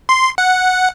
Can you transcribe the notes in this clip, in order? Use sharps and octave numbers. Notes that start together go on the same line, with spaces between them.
C6
F#5